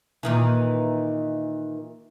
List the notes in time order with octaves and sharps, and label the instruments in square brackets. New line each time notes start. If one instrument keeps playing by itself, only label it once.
[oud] A#2 D#3 E3